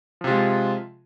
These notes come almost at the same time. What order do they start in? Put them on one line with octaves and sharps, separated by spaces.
F3 C3 F4 G#3